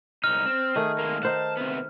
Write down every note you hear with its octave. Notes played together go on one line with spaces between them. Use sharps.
C2 D#4 F6
C4
D#3 A3 G#4
G#3 A#3
D#4 C5 F#5 A5
C3 B3